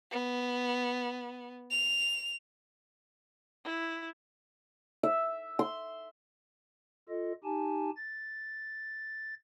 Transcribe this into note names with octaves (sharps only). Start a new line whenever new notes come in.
B3
F7
E4
E5
C6
F4 A4 D#5
D#4 G4 G#5 A5
A6